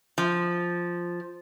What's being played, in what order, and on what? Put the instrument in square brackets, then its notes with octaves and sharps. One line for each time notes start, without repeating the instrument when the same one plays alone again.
[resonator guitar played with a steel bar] F3